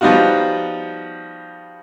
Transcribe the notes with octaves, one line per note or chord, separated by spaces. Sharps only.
F3 G3 B3 D#4 F4 F#4